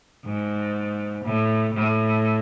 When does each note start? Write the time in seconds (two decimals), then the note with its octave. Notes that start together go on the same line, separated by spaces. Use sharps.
0.25 G#2
1.24 A2
1.74 A2